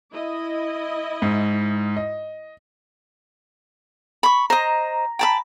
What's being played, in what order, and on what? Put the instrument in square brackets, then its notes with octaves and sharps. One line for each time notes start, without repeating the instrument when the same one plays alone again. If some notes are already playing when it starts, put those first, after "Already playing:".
[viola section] E4 D#5
[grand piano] G#2
D#5
[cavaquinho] B5 C#6
[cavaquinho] C5 D#5 [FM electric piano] A#5
[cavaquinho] G5 A5 B5